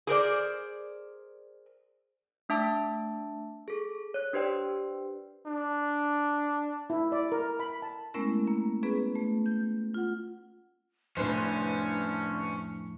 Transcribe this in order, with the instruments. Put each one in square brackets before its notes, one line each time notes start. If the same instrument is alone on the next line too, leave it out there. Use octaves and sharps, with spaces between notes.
[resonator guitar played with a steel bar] G#4 A#4 C5 D5
[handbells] A3 D4 E5 A5 D6 E6
G#4 A4
C#5 F#6
D4 G4 B4 C5 D5 G5
[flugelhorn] D4
[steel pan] E4
D5
A#4
B5
A5
[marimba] G#3 A3 B3 C#4 E4 A#4
A#3
B3 C#4 G#4 B4
A3
G6
F4 F#5
[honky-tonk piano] C2 B4 C5 [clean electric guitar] F2 A2 [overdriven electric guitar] C#4 [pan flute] D4